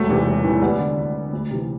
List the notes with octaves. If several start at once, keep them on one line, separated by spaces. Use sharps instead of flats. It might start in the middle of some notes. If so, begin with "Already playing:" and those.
Already playing: E1 F#3 A3
E2 C3 E3
E1
E2 C3 E3
D2 G3 B3
D3
D2
D3
D2
C3 E3